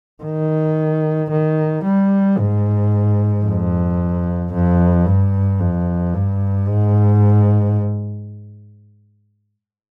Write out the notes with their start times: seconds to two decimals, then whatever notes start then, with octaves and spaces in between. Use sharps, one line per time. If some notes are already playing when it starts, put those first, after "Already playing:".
0.23 D#3
1.31 D#3
1.84 G3
2.38 G#2
3.46 F2
4.53 F2
5.06 G2
5.60 F2
6.14 G2
6.68 G#2